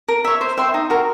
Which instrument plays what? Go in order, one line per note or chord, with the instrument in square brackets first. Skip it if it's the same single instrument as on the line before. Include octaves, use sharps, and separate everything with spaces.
[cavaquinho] A#4
C#5 E5
C5
E5 G5 C6
D#4
F#4 A#4